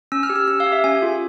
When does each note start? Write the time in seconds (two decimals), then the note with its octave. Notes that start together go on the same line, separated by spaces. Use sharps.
0.12 C#4 E6
0.23 F6
0.30 G4
0.36 E6
0.47 C#4 E6
0.60 F5
0.66 G4
0.72 E5
0.84 C#4 G#5
1.02 F4 G#4